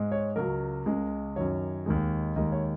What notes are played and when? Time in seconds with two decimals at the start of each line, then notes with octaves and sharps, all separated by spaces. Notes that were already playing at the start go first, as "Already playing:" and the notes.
Already playing: G#2 G#3
0.12 C#5
0.36 C#2 C#3 F#3 A#4
0.86 C#2 C#3 G#3
1.36 F#2 D#3 F#3 C#5
1.86 D#2 D#3 G#3
2.36 D#2 D#3 G#3 D#5
2.52 C#5